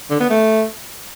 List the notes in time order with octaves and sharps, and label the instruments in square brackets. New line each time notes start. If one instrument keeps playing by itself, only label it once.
[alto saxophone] D3
B3
A3